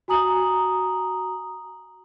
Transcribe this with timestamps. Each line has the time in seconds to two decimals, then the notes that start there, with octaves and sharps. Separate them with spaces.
0.08 F#4 G#5 A#5 D#6 F#7